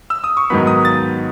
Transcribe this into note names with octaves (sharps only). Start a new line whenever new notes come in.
E6
D#6
C#6
G#2 D#3 F#3 B3 B5
D#6
A6